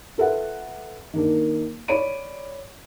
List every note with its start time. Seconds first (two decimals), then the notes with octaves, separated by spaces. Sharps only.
0.18 F4 A4 B4 E5 F#5
1.14 D#3 A#3 D4
1.88 C#5 D5 B5 D7 D#7